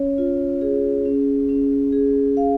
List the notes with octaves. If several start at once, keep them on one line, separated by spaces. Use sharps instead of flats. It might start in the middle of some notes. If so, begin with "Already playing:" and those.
Already playing: C#4 C#5
F4
G#4
C#4
C#4
G#4
F5